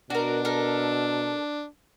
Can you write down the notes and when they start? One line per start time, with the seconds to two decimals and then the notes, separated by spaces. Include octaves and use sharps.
0.10 B2 D4 F#4 A#4
0.45 A4 A#4